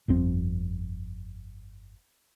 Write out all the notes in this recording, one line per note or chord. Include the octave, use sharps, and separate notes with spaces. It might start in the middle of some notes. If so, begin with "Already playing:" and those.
G1 F2 C4